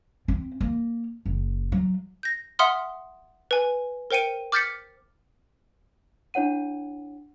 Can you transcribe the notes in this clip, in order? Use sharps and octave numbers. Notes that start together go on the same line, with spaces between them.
C4
A#3
F#1
F#3
G6 A#6
E5 F#5 C6 D#6 F6
B4 G#5
A#4 C5 G5 C#7 D#7
D6 F6 G6 A6 B6 C#7
D4 E4 C#5 F#5 D#7